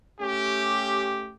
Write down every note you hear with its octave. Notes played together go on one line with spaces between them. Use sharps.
A3 C#4 G4